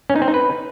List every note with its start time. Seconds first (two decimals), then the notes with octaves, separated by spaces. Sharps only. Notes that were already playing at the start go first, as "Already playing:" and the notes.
0.10 C#4
0.16 D#4
0.22 C4
0.28 D#4
0.34 B4